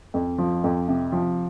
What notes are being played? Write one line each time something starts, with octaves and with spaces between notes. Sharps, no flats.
F2
F3
F2
C3
F3